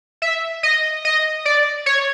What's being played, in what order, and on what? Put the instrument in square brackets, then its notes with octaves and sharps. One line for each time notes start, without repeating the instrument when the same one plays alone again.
[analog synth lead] E5
D#5
D#5
D5
C#5